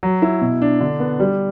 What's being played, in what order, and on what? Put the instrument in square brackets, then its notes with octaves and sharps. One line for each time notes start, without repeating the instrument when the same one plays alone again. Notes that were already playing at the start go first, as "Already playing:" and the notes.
[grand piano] F#3
E4
B2
D4
D3
B3
G3